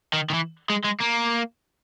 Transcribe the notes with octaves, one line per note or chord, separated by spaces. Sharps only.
D#3
D#3
E3
G#3
G#3
A#3